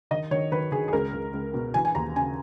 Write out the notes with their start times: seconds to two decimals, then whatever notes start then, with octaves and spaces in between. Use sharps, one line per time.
0.11 D#3 D#5
0.31 D#3 C#5
0.51 D#3 B4
0.72 D#3 G#4
0.88 G#4
0.93 C#2 A#4
1.13 C#2
1.33 C#2
1.54 B2
1.74 E3 G#5
1.85 G#5
1.95 D#2 A#5
2.15 C#3 G#5